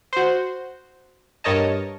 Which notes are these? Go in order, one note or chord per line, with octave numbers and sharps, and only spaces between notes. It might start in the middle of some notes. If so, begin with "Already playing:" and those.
F#4 C5
G2 A#4 C#5 D#5 A5